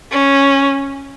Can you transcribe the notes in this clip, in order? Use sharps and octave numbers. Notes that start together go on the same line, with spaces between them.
C#4